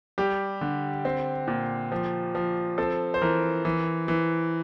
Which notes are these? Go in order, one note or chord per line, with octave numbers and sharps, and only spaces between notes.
G3 G4
D3
C4
A#2
F3
F3
C4 A4
C5
E3 A#4
E3
E3